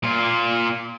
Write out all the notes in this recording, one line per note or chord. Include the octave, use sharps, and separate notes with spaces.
A#2 F4